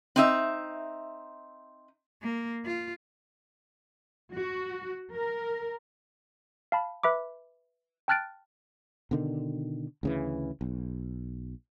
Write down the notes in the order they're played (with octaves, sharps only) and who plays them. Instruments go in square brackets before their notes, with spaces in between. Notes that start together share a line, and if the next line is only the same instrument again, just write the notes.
[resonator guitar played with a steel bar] C4 D#4 E5
[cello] A#3
F4
[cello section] F#4
A#4
[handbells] F5 A5 B5
B4 E5 B5 D6
G5 A5 F6 F#6 A6 D7
[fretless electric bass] B2 D3 D#3
D2 C#3 E3
B1